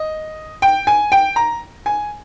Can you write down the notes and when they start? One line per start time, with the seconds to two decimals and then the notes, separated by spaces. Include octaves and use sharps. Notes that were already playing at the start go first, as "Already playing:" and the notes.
Already playing: D#5
0.62 G5
0.87 G#5
1.12 G5
1.36 A#5
1.86 G#5